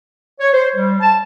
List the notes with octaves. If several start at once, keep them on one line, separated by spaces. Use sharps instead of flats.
C#5
C5
G3
A5